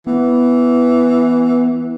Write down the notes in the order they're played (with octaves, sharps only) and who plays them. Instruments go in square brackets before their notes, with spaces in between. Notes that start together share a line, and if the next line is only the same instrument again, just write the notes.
[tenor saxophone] E3 [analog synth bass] B3